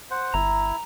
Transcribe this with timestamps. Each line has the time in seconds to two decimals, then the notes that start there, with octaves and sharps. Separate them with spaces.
0.11 C5 F#5
0.34 G1 E4 A#5